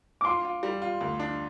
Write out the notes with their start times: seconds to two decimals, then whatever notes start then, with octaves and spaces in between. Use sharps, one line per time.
0.21 D6
0.25 F4 C6
0.45 F4
0.63 G3
0.82 F4
1.01 D2
1.19 D4